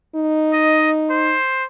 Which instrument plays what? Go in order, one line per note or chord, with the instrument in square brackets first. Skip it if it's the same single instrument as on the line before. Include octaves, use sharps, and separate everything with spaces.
[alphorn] D#4
[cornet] D#5
C5